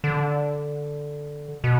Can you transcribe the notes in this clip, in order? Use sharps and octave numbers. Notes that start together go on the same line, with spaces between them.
D3
B2